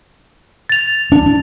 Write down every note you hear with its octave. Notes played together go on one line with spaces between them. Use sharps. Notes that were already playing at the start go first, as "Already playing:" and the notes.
A6 F7
D4